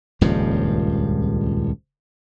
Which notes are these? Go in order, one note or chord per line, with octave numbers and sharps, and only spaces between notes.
D#1 C#2 G2 F3